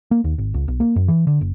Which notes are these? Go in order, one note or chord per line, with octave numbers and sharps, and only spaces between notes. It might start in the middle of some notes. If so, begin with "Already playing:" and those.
A#3
D#2
G#1
C#2
B1
A#3
F#2
E3
D3
F#1